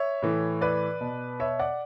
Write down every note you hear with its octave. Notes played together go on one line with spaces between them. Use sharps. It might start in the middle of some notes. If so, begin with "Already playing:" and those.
Already playing: C#5 E5
A2 E3
B4 D5
B2
C#5 E5
D5 F#5